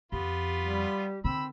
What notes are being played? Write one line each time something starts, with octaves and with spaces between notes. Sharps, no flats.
F2 B3 F4 G4 B5
G3
D3 D#3 C4 B5 E6